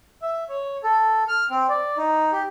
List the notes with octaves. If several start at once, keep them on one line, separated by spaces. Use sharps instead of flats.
E5
C#5
A4
F6
C4
D5
D#4
G4